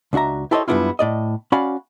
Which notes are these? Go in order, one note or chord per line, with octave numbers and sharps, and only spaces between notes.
C#2 D4 F#4 E5 A#5
E4 G4 A4 C5 C#5 D#5
F#2 G3 B3 D4 E4 F4
A2 D5 D#5
C#4 F#4 D5 F5 B5